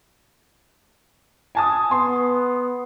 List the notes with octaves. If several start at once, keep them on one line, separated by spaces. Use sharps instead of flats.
G#5 A5 D#6
B3 C6